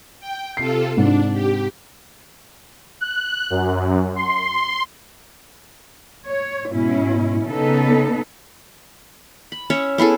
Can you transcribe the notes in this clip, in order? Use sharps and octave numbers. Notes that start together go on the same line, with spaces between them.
G5
C3 F4 A4 C7
G#2 C3 D4
G4
F#6
F#2
C6
C#5
G#2 B2 C#4 E4
C#3 B3 D#4 A4 B4
B5
C#4 C#5 E5
B3 E4 G#4 A4